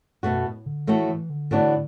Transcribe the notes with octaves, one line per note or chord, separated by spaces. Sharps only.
F#2 B2 A3 F#4
A2
D3
A2 E3 A3 F#4 A4
E3
D3
A2 E3 B3 D4 F#4